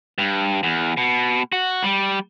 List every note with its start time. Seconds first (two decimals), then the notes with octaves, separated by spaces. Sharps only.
0.18 G2
0.63 E2
0.97 B2
1.52 F#4
1.84 G3